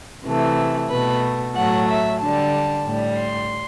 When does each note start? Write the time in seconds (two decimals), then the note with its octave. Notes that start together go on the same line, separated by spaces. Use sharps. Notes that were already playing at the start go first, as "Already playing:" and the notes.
0.24 C3 E3 A3
0.90 B2 A3 B4
1.55 A2 F#3 A3 F#5
1.87 E5
2.20 D3 G3 A5
2.86 A2 G3
3.18 C6